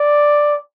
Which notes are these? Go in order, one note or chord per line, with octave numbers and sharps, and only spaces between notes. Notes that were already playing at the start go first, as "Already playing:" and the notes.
Already playing: D5